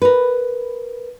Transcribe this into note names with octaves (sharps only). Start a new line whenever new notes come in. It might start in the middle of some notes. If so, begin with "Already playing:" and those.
A#4 B4